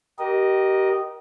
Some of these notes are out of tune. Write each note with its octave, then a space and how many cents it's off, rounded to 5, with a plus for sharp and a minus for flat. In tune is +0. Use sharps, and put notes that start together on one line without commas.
G4 -25 A#4 +20 D#5 -5